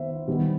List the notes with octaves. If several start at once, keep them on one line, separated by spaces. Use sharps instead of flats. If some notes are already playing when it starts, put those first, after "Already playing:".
Already playing: D#3 B3 C5 E5
D#3 G3 B3